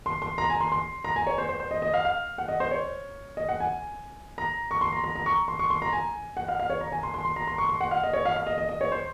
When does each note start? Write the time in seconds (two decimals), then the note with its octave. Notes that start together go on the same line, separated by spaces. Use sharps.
0.06 C6
0.22 C6
0.38 A#5
0.50 G#5
0.60 C6
0.72 C6
1.04 A#5
1.16 G#5
1.27 C#5
1.38 C5
1.49 C5
1.60 C5
1.71 D#5
1.82 D#5
1.94 F5
2.05 F5
2.38 F#5
2.48 D#5
2.60 C5
2.71 C#5
3.37 D#5
3.49 F#5
3.60 G#5
4.38 A#5
4.71 C#6
4.81 C6
4.92 A#5
5.04 A#5
5.16 A#5
5.26 C#6
5.48 C6
5.59 C#6
5.70 C6
5.82 A#5
5.93 G#5
6.37 F#5
6.48 F5
6.60 F5
6.70 C#5
6.81 A#5
6.92 G#5
7.03 C6
7.14 C6
7.25 C6
7.36 A#5
7.47 C6
7.58 C#6
7.69 C6
7.81 F#5
7.91 F5
8.04 D#5
8.13 C#5
8.25 F5
8.36 F5
8.47 D#5
8.58 D#5
8.69 D#5
8.81 C#5
8.92 C5